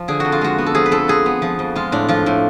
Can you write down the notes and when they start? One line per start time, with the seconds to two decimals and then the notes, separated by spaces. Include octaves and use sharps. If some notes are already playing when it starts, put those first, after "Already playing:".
Already playing: F3
0.08 D3 G#4
0.20 F2 F#4
0.32 F4
0.41 G#3 F#4
0.58 B3
0.66 A4
0.75 F3 G#4
0.86 B4
0.91 F2 A4
1.08 G#3 G#4
1.26 B3
1.42 F3
1.59 F2
1.76 G#3 F4
1.92 A2 D4
2.08 F3 F4
2.26 A2